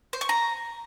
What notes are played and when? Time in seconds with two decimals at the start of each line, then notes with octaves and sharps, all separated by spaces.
0.13 C5
0.21 C#6
0.29 A#5